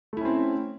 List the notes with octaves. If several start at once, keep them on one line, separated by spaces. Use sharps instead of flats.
A3 C4 C#4 E4